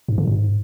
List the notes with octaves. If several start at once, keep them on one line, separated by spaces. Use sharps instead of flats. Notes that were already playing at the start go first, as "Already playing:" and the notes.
G#2
D3
G#2